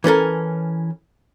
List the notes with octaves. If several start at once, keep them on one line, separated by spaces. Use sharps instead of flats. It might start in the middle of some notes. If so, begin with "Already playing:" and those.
E3 C#4 A4 A#4